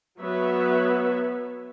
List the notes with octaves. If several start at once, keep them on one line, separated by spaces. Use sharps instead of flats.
F#3 B3 B4 C#5 E5